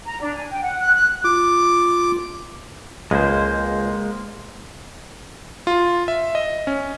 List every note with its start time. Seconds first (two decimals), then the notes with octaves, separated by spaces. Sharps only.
0.05 A#5
0.21 D4
0.34 G#5
0.50 G5
0.63 F#5
0.80 F#6
0.94 F#6
1.24 F4 D6
3.11 C#2 G#3 A#3 C5
5.67 F4
6.08 E5
6.35 D#5
6.67 C#4